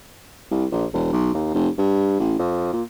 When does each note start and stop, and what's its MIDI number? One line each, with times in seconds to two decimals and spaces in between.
0.51 0.65 36
0.72 0.85 34
0.93 1.12 28
1.12 1.34 35
1.34 1.50 39
1.54 1.68 29
1.78 2.19 43
2.19 2.38 33
2.39 2.72 41
2.73 2.82 46